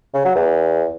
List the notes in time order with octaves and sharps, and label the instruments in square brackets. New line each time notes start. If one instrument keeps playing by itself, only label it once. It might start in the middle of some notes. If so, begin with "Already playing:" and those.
[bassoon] C#3
F#3
E2